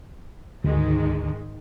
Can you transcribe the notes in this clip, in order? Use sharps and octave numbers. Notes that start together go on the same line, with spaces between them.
D2 G#2 D#3 G#3